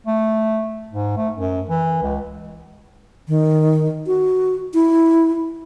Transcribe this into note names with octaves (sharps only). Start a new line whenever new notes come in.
A3
G#2
A3
F#2
E3
C#2
D#3
F#4
E4